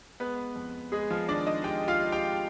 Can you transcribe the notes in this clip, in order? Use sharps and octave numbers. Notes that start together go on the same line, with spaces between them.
G#3 B3 B4
F2
G#3 G#4
F3 F4
D#3 D4 D5
D#4 D#5
G#3 G4 G5
F4 F5
G#3
G4 G5